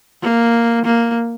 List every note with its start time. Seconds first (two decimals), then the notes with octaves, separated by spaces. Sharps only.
0.22 A#3
0.85 A#3